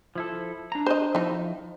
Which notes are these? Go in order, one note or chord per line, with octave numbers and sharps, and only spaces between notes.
F3 E4 A4
D4 A#5
C5 D#5
F3 D#4 E4